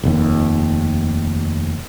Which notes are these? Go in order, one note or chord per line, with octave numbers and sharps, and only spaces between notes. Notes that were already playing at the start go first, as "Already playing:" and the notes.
F1 D#2